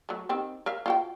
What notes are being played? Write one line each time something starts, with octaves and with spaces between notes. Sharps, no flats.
F#3 A3
D#3 C4 G4
A#4 E5 F5
F4 F#4 G5